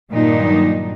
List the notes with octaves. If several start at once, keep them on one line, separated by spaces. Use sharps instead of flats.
G2 A#2 D#3 F#3 D4 D#4